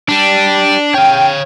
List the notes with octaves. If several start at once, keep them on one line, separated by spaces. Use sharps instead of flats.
D4 G4 D5
C#5 F5 G5